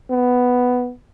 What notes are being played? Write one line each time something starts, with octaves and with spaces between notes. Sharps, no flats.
B3